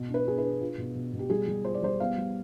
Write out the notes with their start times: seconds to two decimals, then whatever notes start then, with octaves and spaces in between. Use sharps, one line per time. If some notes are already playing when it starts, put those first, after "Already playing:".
Already playing: B2
0.09 D4
0.14 B4
0.26 B3 G#4
0.38 B4
0.44 D4
0.61 F4
0.78 B2
0.95 B2
1.13 B2
1.19 G4
1.30 G3 G#4
1.48 G3
1.65 F4 C5
1.74 D5
1.82 G3 C5
2.00 B3 F5
2.18 G3